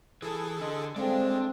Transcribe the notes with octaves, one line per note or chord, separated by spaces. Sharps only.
E3 G#4 A4
D3 D#5 C6
G#3 C4 D4 A4 D5 F5 G5